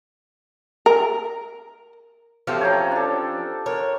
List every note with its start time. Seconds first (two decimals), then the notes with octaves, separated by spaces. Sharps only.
0.86 A#4
2.47 F3 A3 C4 C#4 G4 F5
2.61 C#5 G5 A#5
2.92 D4 A4
3.66 A#4 C#5